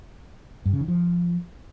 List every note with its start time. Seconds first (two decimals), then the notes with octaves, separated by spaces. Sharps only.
0.66 G2
0.73 C#3
0.81 D#3
0.88 F3